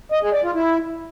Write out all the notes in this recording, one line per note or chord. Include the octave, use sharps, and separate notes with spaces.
D#5
G#4
D5
F4
E4